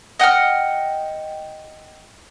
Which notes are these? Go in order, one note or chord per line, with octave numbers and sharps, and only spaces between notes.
D#5 F#5 G5 F6